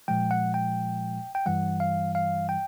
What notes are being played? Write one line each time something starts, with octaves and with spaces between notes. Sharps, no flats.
A#2 F3 G#3 G5
F#5
G5
G5
G2 E3 G3 F#5
F5
F5
G5